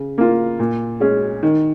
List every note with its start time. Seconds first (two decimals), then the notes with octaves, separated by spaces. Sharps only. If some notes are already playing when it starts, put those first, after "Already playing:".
Already playing: C#3
0.18 A#3 F4
0.59 A#2
1.00 G#3 C#4 G#4
1.43 D#3